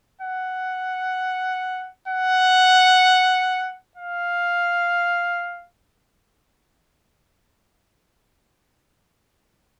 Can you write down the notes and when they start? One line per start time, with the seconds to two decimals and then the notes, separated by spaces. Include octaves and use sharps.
0.21 F#5
2.08 F#5
3.97 F5